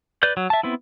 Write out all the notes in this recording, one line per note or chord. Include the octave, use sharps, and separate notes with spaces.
B4 D5 G6
F#3
E5 A5
B3 C4 E4